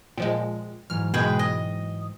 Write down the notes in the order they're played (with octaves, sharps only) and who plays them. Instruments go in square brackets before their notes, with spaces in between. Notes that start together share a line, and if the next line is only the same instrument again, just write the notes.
[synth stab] A#2 F3 G#3 [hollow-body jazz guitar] G5
[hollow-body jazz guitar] G#2 E3 F#3 [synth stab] F6
[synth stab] B2 G#3 [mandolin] G#4 B4 G5
[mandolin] D#5